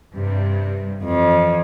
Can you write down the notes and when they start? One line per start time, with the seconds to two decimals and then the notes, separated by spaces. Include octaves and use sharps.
0.14 G2 C3 G3
1.04 F2 E3